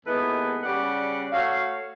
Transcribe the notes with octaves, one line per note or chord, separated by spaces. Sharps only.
D#2 G#3 B3 E4 A4 B4
C#3 G3 G4 D5 F#5
A3 F#4 C#5 F5